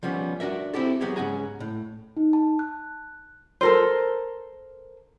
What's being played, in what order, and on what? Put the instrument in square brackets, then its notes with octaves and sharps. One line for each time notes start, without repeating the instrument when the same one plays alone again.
[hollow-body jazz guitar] F3 G3 B3 C#4
D4 F#4 A#4 E5
C4 E4 G4 A4
F#3 B3 G4 G#4
G#2 C#3 F#5 G#5 A#5
A2
[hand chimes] D#4
A5
F#6
[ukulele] A4 A#4 C5